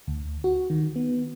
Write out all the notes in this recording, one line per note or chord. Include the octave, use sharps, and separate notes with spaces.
D2
F#4
D#3
B3